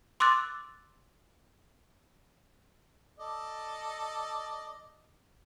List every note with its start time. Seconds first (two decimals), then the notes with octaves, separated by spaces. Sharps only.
0.20 C6 D6 E6 F#6 A6
3.19 A4 D5 D#5